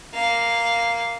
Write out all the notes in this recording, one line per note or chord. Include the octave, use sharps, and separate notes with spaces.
A#3 F5